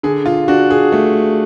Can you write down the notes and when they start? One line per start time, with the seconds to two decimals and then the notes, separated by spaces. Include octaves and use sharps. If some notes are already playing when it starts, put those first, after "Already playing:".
0.03 D3 G#4
0.26 F4
0.48 D4 F#4
0.70 G#4
0.92 A3